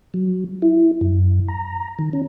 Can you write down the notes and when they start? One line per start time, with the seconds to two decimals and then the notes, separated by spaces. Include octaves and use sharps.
0.14 F#3
0.62 E4
1.01 F#2
1.48 A#5
1.99 D#3
2.13 C#4